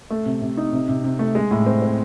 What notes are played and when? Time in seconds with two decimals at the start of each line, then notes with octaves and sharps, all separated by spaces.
0.10 A3
0.26 C3
0.42 C3
0.57 D#4
0.73 C3
0.89 C3
1.04 C3
1.19 A3
1.35 G#3
1.51 A2
1.66 C4
1.82 C4